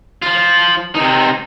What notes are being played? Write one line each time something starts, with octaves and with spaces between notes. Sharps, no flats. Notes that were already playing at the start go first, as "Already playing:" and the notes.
F3 F4
C3 D#4